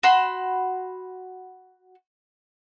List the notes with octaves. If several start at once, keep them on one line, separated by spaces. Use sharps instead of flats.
F#4 B5 C6